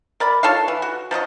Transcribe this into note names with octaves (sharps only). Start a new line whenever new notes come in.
A#4 D5 B5
F4 A4 C#5 F5
E3
F#4
F3 F#3 F4 D#5